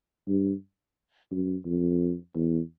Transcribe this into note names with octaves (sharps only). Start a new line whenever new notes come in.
G2
F#2
F2
E2